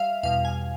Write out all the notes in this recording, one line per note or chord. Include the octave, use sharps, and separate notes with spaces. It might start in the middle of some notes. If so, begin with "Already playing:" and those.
Already playing: G3 E5 F5
E2 B2 G3 F5
G#5